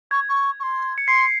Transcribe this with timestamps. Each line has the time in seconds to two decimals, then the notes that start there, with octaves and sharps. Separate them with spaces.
0.11 C#6 G#6
0.28 C#6
0.59 C#6
0.62 C6
0.98 C#7
1.07 C6 C7